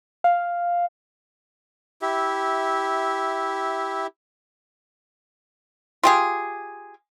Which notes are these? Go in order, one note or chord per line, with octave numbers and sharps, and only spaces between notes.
F5
E4 G4 E5
F4 G4 G#4